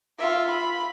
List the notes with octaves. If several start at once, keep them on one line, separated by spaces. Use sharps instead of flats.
F4 E5
B5